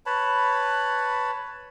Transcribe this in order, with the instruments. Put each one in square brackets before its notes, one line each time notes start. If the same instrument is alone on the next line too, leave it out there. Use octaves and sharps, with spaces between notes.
[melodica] B4 C#5 A5 B5